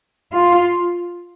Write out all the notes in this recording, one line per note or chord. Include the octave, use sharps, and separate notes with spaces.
F4